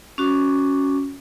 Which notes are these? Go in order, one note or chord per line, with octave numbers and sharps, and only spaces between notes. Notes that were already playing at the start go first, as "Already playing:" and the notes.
C#4 F#4 D6